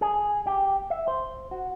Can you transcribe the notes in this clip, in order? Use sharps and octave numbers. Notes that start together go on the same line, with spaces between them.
G#4
G4
E5
C5
F#4